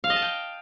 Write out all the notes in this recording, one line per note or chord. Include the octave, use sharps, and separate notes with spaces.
F5
D#5
A5
G5